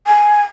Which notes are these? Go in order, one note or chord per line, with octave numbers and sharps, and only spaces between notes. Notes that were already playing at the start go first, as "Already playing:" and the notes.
G#5